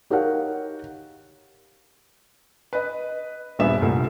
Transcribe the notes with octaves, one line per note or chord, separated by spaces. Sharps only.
D#4 G4 A#4 C#5 F5 F#5
B4 D#5
D#1 G2 G3 B3 E5 E7
C2 A#2 A3